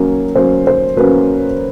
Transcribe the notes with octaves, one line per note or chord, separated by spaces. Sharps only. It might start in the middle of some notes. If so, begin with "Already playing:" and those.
Already playing: F#3 A#3 C#4
F#3 A#3 C#4 C5
C5
F#3 A#3 C#4 B4